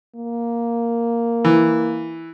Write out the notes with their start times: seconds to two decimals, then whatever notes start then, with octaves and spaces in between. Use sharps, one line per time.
0.16 A#3
1.45 E3